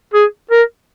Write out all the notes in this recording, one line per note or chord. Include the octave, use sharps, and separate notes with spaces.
G#4
A#4